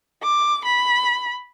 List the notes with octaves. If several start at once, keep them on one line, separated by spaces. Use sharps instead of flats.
D6
B5